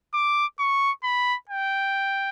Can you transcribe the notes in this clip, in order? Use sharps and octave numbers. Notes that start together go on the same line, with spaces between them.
D6
C#6
B5
G5